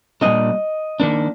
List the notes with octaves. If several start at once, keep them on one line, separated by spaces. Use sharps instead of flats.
A#2 G3 A#3 D4 D#5
D#3 A#3 D4